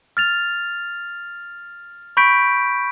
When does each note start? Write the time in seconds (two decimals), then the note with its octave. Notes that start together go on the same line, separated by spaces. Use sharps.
0.17 F6 A6 F7
2.17 B5 C#6 G6 B6 D7